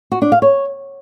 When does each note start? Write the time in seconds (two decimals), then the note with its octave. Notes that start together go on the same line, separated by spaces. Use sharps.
0.12 F#4
0.22 D4
0.32 F5
0.42 C#5